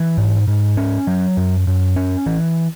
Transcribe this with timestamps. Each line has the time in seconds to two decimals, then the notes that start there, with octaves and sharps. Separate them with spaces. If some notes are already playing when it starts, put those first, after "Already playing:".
Already playing: E3
0.18 G#2
0.48 G#2
0.77 C#4
1.07 F#3
1.37 F#2
1.67 F#2
1.96 C#4
2.26 E3